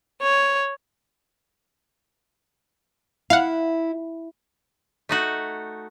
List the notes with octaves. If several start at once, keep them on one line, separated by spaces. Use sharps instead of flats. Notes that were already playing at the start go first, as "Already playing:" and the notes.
C#5
E4 F5 F#5
A3 D#4 F#4